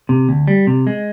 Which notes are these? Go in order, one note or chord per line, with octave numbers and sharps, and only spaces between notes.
C3
D2
G3
C3
G#3